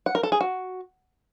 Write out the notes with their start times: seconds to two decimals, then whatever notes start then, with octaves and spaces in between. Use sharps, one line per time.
0.06 F#5
0.15 A#4
0.23 A4
0.32 G#4
0.41 F#4